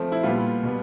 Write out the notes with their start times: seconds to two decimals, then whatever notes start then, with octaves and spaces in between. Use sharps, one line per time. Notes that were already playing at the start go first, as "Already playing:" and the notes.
Already playing: F3 A3 C4
0.12 E4
0.23 A#2 G3 B3 F4
0.63 B2 G3 B3